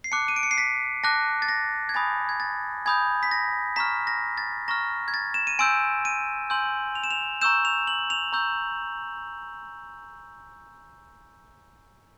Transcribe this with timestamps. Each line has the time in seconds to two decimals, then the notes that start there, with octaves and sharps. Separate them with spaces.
0.04 C7
0.12 A5 D6 F#6 C#7
0.28 D#7
0.36 D7
0.43 C#7
0.51 C7
0.58 B6
1.04 A5 D6 F#6 A#6
1.42 A6
1.49 A#6
1.89 G#6
1.94 G#5 B5 D#6 G6 A6
2.29 G#6
2.40 A6
2.86 G#5 B5 D#6 G6 G#6
3.23 B6
3.31 A#6
3.76 A#5 C#6 F6 B6
4.07 A#6
4.38 A6
4.68 A#5 C#6 F6 A#6
5.08 G#6
5.14 A6
5.34 E7
5.47 D#7
5.59 G#5 C6 E6 G6 D7
6.05 D#7
6.50 G#5 C6 E6 G6 F#7
6.95 F7
7.03 E7
7.11 F7
7.41 A#5 C#6 E6 G6 E7
7.65 F7
7.87 F#7
8.10 F7
8.32 A#5 C#6 E6 G6